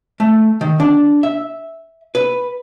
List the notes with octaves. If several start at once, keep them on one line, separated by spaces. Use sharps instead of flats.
A3
D#3
D4
E5
B4